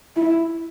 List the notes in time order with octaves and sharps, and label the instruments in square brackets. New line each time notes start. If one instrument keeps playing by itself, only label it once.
[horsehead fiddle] E4